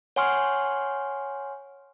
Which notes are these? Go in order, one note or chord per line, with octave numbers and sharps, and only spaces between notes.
C#5 F#5 G#5 C6 C#6 F6